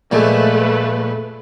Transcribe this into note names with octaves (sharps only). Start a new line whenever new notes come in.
A#2 F3 G#3 A3 B4